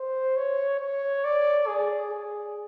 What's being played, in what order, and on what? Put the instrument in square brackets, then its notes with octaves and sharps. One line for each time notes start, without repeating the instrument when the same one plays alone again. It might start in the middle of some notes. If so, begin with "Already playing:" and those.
Already playing: [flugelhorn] C5
C#5
C#5
D5
G#4
G#4